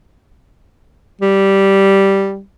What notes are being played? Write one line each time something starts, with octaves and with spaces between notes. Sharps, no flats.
G3